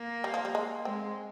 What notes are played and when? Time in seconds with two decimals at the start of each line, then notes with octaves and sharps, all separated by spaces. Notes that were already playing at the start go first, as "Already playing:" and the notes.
Already playing: A#3
0.24 G3
0.34 F3
0.45 G3
0.55 G#3
0.85 G#3 C4